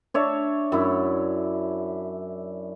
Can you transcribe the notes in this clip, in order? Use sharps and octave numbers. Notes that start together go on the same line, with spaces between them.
D4 C#5 E5
F#2 E4